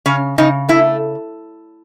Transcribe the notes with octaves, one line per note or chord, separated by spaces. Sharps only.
C#3 C#4
C#3 D#4
A3 E4